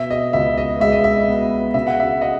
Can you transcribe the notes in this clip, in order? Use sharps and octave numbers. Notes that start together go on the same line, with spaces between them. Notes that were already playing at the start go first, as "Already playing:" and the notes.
Already playing: B2 E5
D#5
C#2 E5
D#5
G#3 E5
D#5
E5
B3
C#3 E5
F#5
E5
D#5 F#5